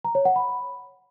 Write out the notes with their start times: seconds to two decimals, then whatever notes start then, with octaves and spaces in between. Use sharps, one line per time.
0.05 A#5
0.15 C#5
0.25 F#5
0.36 B5